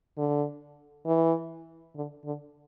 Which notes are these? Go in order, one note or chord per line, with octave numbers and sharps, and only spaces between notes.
D3
E3
D3
D3